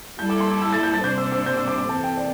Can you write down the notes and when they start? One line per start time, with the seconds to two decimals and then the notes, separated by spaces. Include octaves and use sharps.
0.19 G3 E4 A4 G6
0.30 D6
0.40 C6
0.51 D6
0.62 E6
0.73 A6
0.83 G6
0.94 A6
1.03 C3 G3 D4 C5 G6
1.18 E6
1.32 E6
1.46 G6
1.57 E6
1.68 D6
1.78 D6
1.89 C3 E3 C4 A4 A5
2.04 G5
2.17 D5